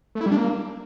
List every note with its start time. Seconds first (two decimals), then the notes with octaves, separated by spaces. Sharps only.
0.15 A3
0.21 E4
0.26 G3
0.32 D4
0.37 A#3